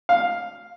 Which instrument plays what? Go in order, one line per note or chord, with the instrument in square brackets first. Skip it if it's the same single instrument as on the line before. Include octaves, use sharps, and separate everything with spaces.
[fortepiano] F5